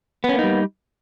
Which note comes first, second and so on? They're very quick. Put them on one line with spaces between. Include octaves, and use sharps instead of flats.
B3 C#4 A#3 D#4 G3